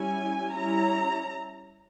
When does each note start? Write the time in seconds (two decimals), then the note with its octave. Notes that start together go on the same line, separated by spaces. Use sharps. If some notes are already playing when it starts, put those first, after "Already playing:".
Already playing: G3 C#4 E4 G#5
0.54 G3 C#4 E4 A#5